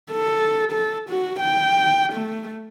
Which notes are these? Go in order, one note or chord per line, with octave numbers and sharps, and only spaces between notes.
A4
A4
F#4
G5
A3